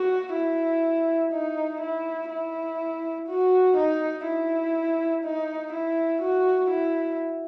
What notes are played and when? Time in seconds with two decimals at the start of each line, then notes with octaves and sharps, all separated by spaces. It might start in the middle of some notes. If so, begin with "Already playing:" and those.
Already playing: F#4
0.35 E4
1.33 D#4
1.81 E4
2.30 E4
3.28 F#4
3.77 D#4
4.26 E4
5.24 D#4
5.73 E4
6.22 F#4
6.71 E4